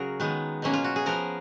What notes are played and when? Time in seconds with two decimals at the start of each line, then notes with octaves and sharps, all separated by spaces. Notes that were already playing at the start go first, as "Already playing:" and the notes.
Already playing: C#3 F#3 F#4 G#4 A#4
0.20 D#3 G#3 B3
0.62 B2 F#3 A#3 C#4
0.73 F4
0.84 F#4
0.96 G#4
1.06 F3 B3 A#4